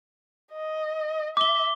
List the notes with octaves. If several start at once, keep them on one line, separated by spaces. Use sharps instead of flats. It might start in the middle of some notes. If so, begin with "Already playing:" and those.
D#5
E5 D6 G7